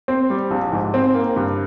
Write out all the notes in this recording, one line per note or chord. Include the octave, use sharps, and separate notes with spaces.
C4
G3
A#1
G#2
C4
A#3
G2